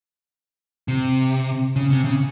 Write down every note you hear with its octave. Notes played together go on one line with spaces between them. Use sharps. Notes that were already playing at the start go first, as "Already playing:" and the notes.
C3
C#3
C3
C#3